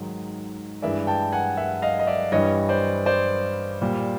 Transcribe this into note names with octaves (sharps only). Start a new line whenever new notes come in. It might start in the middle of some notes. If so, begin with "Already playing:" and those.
Already playing: G#2 D#3 F#3
G2 E3 G#3 D5 E5
G5 A5
F#5 G#5
E5 F#5
D#5 F5
D#5
D5 E5
G2 E3 G3 C#5 D#5
C5 D5
C5 D5
A#2 G3